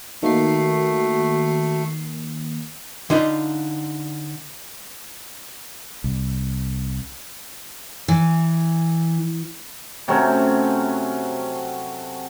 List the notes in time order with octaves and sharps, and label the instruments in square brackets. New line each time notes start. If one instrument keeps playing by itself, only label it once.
[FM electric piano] D#3 A#3 C7 [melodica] A3 [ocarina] F#4
[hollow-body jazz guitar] D3 D#4 F4 B5
[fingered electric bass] C2
[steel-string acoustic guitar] E3
[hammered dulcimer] C3 F#3 A3 C#4